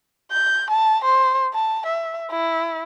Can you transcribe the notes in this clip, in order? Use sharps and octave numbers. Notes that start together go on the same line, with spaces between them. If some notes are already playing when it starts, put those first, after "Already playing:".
G6
A5
C5
A5
E5
E4